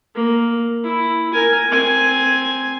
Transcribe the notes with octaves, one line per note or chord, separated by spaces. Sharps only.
A#3
E4
A#4 G#5
C4 G#5